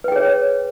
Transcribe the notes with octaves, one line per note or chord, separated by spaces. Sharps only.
G#4 B4 C#5 G5